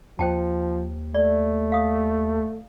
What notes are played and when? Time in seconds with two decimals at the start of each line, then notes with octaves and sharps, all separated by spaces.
0.19 D#2 F3 C5 G5 A5
1.14 A3 D5
1.72 F5 D#6